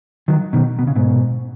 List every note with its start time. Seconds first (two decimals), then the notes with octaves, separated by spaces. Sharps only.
0.28 D#3 F#3
0.53 B2 D#3
0.79 B2
0.87 C#3
0.96 G#2 B2